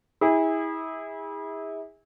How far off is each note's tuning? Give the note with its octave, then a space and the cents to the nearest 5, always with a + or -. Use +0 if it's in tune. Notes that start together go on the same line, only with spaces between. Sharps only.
E4 -30 G#4 -30